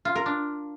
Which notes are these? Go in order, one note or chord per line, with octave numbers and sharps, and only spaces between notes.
F4
A#4
D4